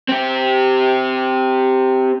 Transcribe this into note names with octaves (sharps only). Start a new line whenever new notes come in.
C4 G4